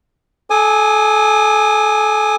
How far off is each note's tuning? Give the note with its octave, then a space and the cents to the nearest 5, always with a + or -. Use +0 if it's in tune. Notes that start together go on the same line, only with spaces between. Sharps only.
A4 -30 G#5 +0 D#6 -45